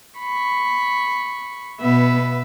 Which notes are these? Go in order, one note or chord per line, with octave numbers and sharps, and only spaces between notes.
B5 C#6
B2 B3 B4 E5